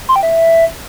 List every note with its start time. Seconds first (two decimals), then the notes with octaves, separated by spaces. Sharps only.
0.09 C6
0.16 G5
0.23 E5